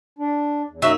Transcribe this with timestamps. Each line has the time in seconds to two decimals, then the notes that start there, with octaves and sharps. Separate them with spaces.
0.19 D4
0.69 E2
0.82 F#2 F#3 A#3 D#4 E5